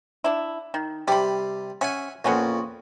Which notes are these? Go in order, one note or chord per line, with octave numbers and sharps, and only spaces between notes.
D4 E4
D#3
C3 G3 G4 B5
C#4 E5 F#5 G#5
F2 A#2 B3 C#4 F#4